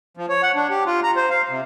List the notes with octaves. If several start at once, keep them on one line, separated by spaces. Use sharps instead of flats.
F3
C#5
F#5
D4
G4
F4
A#5
C5
F5
C3